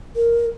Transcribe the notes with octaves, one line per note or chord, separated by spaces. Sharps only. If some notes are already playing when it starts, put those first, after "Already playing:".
A#4